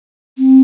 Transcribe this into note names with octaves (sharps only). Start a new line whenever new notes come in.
C4